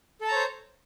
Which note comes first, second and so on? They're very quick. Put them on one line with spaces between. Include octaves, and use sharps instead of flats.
A4 A5 A#5 C#5 C5